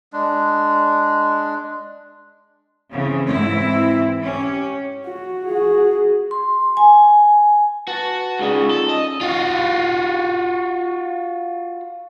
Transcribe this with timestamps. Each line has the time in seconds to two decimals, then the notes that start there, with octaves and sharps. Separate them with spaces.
0.13 G#3 D4
2.93 C#3 E3 C4
3.29 G#2 E3 C4 E4
4.23 C#4 G4
5.06 F#4
5.47 F#4 G#4
6.31 C6
6.77 G#5
7.88 F#4 B4 A5 A6
8.40 C#2 C#3 D#4 G#4 D5
8.52 F4
8.71 C#4 D#4 A4
8.90 D#5
9.21 F4 F#4